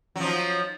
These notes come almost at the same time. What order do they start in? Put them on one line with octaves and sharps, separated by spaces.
F#3 F3 D#4